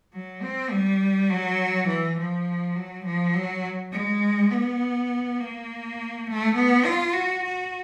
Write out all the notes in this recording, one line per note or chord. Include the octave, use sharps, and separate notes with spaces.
F#3
C4
G3
F#3
E3
F3
F#3
F3
F#3
G#3
B3
A#3
A3
B3
F4
F#4
F#4